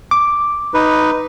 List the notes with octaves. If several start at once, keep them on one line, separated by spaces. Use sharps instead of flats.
D6
D#4 B4